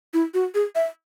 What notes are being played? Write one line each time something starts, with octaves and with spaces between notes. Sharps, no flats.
E4
F#4
G#4
E5